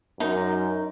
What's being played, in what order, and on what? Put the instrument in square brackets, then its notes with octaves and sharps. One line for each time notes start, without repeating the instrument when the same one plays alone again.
[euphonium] F#2 [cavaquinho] D#4 [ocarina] A#4